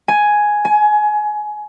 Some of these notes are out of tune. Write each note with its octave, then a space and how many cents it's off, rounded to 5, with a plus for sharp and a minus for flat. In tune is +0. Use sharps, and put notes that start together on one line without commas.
G#5 +5
G#5 +25